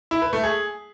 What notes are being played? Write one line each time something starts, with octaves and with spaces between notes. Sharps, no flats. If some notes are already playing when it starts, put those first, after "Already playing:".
E4
B4
A3
G#4